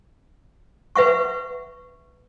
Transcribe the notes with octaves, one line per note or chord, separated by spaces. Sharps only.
B4 E5 F#5 C#6